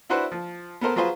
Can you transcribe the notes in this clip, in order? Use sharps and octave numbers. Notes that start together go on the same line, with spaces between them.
D4 E4 F#4 B4 C5 F#5
F3
B3 A4 A#4 C5
F#3 F4 G#4 B4 C5